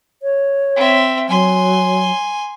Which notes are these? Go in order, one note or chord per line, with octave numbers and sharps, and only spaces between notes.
C#5
C4 E5
F#3 G#5 C6